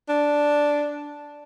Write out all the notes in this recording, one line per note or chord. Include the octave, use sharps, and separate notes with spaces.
D4